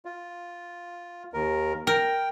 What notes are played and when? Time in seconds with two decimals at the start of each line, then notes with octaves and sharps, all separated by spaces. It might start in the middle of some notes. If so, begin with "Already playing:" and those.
0.05 F4
1.33 D#2 A#4
1.87 A#4 G5